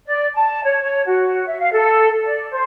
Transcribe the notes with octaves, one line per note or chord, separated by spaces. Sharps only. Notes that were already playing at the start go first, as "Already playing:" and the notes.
D5
A5
C#5
C#5
F#4
E5
F5
A4
D5
C5